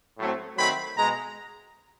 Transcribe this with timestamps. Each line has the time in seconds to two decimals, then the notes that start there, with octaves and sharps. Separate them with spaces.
0.18 A2 F#3 A3 C4
0.57 D#3 F#3 A3 C4 B5
0.96 B2 G#3 A#5